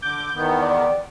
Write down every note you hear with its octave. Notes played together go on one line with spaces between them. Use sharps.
D3 D6 G6
E2 D#3 B3
D5